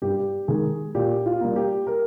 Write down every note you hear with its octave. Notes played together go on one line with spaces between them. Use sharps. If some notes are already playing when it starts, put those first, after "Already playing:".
G2 G4
D#3 G#3 G#4
A#2 G4
F4
G3 A#3
G4
A#4